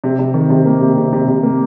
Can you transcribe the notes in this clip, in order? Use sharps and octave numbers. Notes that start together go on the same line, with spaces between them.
C3
C3
D#3
C3
A#3
C3
C3
C3
C3
A#3